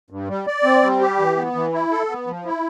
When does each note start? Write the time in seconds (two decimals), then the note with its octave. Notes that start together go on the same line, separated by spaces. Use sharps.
0.10 G2
0.28 G3
0.47 D5
0.64 C4
0.82 G3
1.01 G4
1.19 E3
1.37 B3
1.55 E3
1.73 E4
1.91 A4
2.09 B3
2.27 F3
2.45 E4